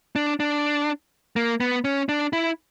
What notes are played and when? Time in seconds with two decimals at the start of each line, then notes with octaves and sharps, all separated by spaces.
0.16 D4
0.40 D4
1.36 A#3
1.60 B3
1.84 C#4
2.09 D4
2.33 E4